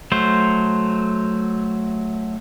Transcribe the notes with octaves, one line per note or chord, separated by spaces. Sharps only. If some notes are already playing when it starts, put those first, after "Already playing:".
F#3 A3 C5